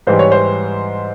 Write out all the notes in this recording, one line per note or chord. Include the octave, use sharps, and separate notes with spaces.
G#2 E3 G3 C5
C#5
C5